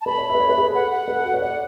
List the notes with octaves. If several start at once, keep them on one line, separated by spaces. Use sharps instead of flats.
A5
B4 B5
C#5
E5
B4
C#5
B4
G#4
A4
F#5
F#5
B4
A4
F#4
C#5
D5 F#5